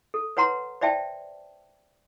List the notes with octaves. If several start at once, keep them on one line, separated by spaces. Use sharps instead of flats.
A4
B4 C#5 F#5 A#5 C6
C5 D5 E5 G5 A5